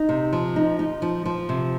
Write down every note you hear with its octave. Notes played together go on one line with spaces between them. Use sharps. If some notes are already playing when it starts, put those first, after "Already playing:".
Already playing: D#4
C3
F3
D#4
D#4
F3
F3
C3